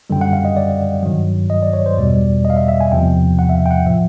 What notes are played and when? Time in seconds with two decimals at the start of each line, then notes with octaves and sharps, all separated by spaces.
0.10 F#2 D3 G3 G5
0.21 F#5
0.33 F5
0.45 D#5
0.56 D5
1.03 G2 D#3 F#3
1.50 D#5
1.63 D5
1.73 C#5
1.86 C5
1.97 E2 B2 G3 D5
2.45 D#5
2.50 F5
2.57 E5
2.68 E5
2.81 G#5
2.92 E2 C3 F3 G5
3.39 F#5
3.49 E5
3.55 F5
3.66 G5
3.71 F#5
3.86 A2 F3 E5